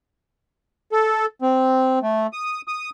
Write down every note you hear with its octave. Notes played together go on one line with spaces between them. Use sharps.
A4
C4
A3
D#6
D#6